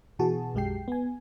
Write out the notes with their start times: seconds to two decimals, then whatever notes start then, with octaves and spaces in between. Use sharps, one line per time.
0.19 B2 E3 F#4 G#4 A5
0.54 B1 F#2 G#3 G4 G5 C7
0.88 B3 G#5